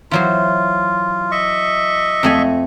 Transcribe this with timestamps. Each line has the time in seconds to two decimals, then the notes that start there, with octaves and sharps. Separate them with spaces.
0.11 E3 F#3 F4 C5
1.31 D#5 E5 C#6
2.23 F2 A3 G#5